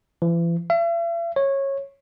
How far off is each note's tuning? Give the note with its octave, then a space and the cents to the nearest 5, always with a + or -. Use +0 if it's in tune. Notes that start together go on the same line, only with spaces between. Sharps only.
E3 +40
E5 +45
C#5 -15